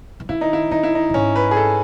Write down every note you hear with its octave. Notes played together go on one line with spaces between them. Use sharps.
E3
D#3 E4
D#4
E4
D#3 D#4
E4
D#4
F#2
G#2 C#4
B4
G#4
A4